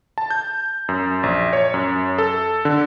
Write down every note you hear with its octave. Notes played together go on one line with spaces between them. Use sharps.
A5
G6
F#2
A#1
C#5
F#2
A4
D3